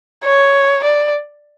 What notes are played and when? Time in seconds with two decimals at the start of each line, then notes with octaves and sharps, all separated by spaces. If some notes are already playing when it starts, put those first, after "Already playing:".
0.25 C#5
0.84 D5